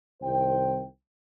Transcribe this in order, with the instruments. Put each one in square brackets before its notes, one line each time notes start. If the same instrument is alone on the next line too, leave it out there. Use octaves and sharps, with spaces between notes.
[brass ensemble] C2 D#3 C5 G5